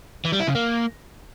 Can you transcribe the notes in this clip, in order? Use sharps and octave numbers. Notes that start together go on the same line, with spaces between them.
E3
G3
E4
C#3
A#3